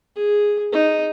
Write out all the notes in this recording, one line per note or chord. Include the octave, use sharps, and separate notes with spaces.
G#4
D#4